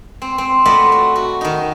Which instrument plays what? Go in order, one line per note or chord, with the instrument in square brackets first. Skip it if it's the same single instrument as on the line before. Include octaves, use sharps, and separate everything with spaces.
[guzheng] C4
C4
A3 F4 B4 D5 D#5 F#5
F#4
F#4
D#3 D#4